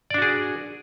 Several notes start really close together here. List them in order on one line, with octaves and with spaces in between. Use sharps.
D5 D4 F#4 G#4